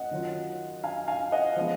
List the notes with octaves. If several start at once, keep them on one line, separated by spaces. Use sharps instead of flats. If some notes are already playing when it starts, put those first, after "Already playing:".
Already playing: D#5 F#5
D#3 F#3 C#4 F4
F5 G#5
F5 G#5
D#5 F#5
F3 G#3 B3